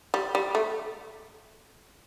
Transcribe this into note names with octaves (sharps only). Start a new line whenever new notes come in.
G3
G3
A3